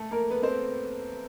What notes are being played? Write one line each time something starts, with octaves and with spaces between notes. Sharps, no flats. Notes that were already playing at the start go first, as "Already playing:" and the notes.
Already playing: A3 A4
A#3 A#4
B3 B4
C4 C5